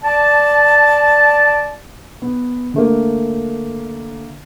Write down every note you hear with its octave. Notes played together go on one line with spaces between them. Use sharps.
D5 A5
B3
D3 A3 A#3